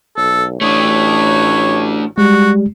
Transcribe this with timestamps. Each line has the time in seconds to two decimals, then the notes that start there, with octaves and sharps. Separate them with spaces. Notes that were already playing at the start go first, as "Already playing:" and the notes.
0.17 B1 A4
0.61 A1 A3 D4 C#5
2.18 G3 G#3 F#4